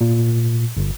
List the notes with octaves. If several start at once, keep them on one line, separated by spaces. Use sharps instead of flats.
A#2
G1